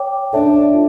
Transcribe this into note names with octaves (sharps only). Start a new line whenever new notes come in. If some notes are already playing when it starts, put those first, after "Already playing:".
Already playing: C#5 G5 D6
D4 A4 C#5 E5 A5
F4